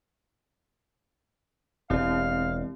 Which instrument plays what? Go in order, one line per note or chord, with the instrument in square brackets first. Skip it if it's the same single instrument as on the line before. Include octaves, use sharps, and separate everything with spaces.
[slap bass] E1 [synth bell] C4 E4 G4 [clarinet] F5